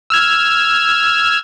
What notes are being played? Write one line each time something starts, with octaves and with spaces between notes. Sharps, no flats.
E6 F6 G#6